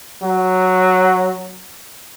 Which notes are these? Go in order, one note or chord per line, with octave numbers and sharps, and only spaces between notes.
F#3